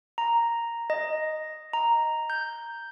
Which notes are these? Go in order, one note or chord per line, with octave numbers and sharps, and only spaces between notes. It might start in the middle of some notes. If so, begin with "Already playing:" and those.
A#5
D#5
A#5
G6